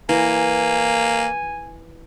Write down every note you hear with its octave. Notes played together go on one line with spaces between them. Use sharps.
E3 A#3 G#5 A#5